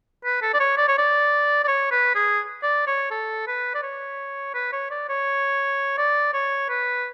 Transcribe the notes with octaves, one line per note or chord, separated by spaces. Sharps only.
B4
A4
D5
C#5
D5
C#5
D5
D5
C#5
B4
G#4
D5
C#5
A4
B4
D5
C#5
B4
C#5
D5
C#5
D5
C#5
B4